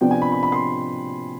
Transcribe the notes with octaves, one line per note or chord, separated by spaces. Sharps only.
C3 F3 B3 D4 G5
G#5
B5
B5
B5
C6